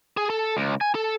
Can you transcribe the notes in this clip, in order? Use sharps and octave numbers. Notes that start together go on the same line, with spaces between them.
G#4
A4
C#2
G#5
A4